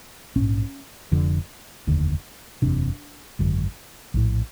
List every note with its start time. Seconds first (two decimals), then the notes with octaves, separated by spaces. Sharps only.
0.36 A#1 G#2 C#4
1.12 F1 F2 D3
1.87 F1 D#2 D3
2.62 F#1 E2 C3 D4
3.39 G#1 F#2 D3
4.14 A#1 A2